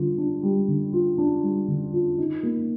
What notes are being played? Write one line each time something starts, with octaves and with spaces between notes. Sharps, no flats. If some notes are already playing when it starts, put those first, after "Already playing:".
Already playing: D3 G3 F4
D4
G3
D3
F4
D4
G3
D3
F4
D#4
A#3